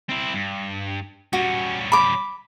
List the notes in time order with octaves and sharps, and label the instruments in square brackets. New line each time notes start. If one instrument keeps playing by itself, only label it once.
[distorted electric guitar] C4 E4
G2
[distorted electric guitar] G3 C#4 [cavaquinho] F#4
[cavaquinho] B5 D6